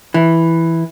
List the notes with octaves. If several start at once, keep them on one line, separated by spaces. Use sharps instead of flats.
E3